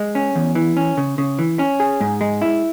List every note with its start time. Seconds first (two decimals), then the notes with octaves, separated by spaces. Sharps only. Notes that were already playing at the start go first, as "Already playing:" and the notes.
Already playing: G#3
0.15 C#4
0.36 E2
0.55 E3
0.77 C#4
0.97 C#3
1.18 C#3
1.39 E3
1.59 C#4
1.80 G#4
2.01 G#2
2.21 G#3
2.41 E4